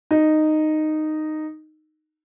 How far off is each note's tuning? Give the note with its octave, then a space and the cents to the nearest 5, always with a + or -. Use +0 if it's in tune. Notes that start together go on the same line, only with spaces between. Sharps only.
D#4 -10